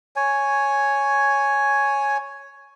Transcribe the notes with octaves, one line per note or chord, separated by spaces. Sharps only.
C#5 G#5